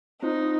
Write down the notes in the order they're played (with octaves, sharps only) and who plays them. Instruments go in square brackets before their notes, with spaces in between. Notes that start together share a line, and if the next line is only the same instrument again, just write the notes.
[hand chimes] C4 F4 C5 [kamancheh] D#4